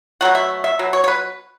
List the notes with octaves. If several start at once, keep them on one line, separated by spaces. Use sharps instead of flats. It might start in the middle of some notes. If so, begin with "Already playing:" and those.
B2 F#3 A3 F#5
E5
E5
B2 F#3
C#5
C#5
B4